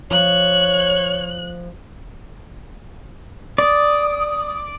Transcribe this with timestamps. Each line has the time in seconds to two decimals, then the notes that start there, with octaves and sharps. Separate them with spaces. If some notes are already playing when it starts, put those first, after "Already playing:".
0.11 F3 C#5 F#6
3.58 D5 D#6